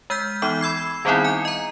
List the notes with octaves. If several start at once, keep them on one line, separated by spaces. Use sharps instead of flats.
G#3 F6 G6 B6
E3 B3 D#4 D6 G7
B5 E6 G#6 C7
D#3 G3 B3 C4 D#4 E4
G#5
D#5 A#5